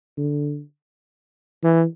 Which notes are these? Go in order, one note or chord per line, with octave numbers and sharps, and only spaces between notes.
D3
E3